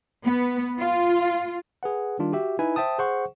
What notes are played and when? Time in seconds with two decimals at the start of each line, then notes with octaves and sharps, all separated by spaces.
0.25 B3
0.79 F4
1.83 G#4 B4 F#5
2.19 D#3 G3 D4 F4
2.33 F#4 G4 E5
2.59 D#4 E4 B4 G#5
2.76 C5 E5 G5 A5 D#6
2.99 G#4 C5 F#5 C#6